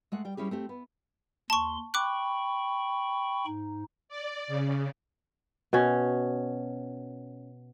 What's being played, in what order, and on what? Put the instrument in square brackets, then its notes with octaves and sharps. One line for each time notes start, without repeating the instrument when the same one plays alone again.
[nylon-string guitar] G#3 A3 F#5
G3 G5
G3 C#4 E4 G4 G#4
A3 C4 G4
B3
[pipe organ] D#2 C6 [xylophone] A5 C#6
[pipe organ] G5 B5 C#6 [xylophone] D6 F#6
[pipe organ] G#2 D#4
[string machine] D5
C#3
[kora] B2 C#4